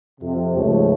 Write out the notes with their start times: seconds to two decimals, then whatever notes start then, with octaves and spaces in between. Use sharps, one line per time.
0.20 F2 C3
0.56 C#2 G#2 F3 A3 C#5